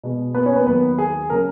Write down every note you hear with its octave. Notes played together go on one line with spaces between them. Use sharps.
B2 G#3 B3
B3 B4
C#4 C#5
B3 B4
D#2 D#3 F#3 B3 B4
G#4
C#3 F#3 A#4